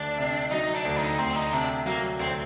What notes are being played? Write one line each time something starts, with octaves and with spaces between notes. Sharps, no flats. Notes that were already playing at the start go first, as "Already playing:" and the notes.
Already playing: D2 D4
C3
F#3 D#4
D4
D2
D#4
D2 C4
D#4
C3 D4
F#3 A#3
D2 C4